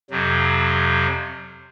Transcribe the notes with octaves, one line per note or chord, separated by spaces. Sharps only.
F2 C3 F#3